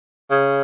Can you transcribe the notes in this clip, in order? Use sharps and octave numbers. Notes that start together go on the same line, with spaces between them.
C#3